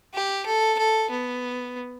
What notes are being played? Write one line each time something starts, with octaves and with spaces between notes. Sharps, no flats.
G4
A4
A4
B3